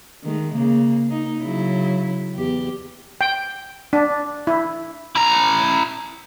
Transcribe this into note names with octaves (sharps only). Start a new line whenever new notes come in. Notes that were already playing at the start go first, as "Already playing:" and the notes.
D#3 G#3 A3
C#3 A#3
A#3 D#4
C#3 F#3 E4
E2 G4
G5
D4
E4
E4 A#5